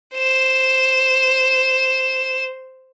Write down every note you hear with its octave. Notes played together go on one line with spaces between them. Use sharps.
C5 E7